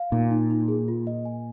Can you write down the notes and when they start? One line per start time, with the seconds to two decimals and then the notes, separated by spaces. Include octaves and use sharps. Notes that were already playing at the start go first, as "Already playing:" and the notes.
Already playing: F5
0.12 A#2 D#4
0.31 D#4
0.50 D#4
0.68 G#4
0.88 F4
1.07 D#5
1.25 G#5